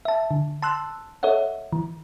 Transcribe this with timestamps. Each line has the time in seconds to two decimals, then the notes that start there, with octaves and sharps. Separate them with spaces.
0.05 E5 A5
0.31 D3
0.62 A5 C6 E6 F#6
1.23 A4 C#5 D#5 E5 F#5
1.73 E3